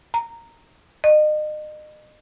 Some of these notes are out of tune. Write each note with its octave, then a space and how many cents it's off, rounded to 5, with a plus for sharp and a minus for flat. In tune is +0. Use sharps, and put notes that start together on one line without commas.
A#5 -10
D#5 -35